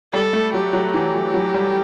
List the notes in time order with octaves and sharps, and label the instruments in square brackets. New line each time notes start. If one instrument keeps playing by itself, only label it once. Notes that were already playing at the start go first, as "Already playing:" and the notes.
[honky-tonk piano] G3 [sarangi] A4
[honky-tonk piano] A3
[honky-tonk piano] F#3 [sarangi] G4
[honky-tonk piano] F#3
[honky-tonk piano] E3 [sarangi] G4
[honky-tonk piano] F#3
F#3
G3